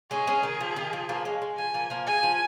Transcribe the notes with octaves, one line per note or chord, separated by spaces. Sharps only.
G#3 C#4 G#4
G#3 C#4
D#3
F3
D#3
F3
F3 A#3
G#3 C#4
G#3
F3 G#5
F3 A#3
F3 A#3
G#3 G#5
F3